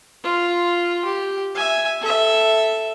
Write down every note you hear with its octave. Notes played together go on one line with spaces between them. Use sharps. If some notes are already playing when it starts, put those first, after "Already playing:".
F4
G4
E5 G#5
A4 E5